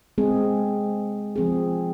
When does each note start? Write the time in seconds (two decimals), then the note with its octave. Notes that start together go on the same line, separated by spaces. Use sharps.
0.18 G#3 C4 G#4
1.36 F3 C4 G#4